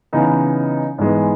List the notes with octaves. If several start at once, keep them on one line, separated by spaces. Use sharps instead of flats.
C#3 E3 B3 D#4
G#2 E3 G#3 B3